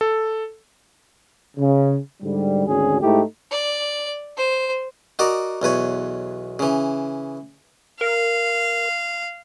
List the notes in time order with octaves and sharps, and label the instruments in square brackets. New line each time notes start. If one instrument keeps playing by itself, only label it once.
[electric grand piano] A4
[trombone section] C#3
G#2 D3 G3
G#1 D2 D3 C#4 G#4
G#2 A3 D#4 E4 G4
[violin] D5
C5
[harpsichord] D#4 F#4 A#4 D5
B1 E2 B4 C#5
C#3 E3
[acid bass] A#4 [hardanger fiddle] F5